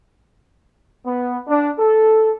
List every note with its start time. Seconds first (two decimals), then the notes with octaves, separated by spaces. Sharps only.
1.05 B3
1.48 D4
1.78 A4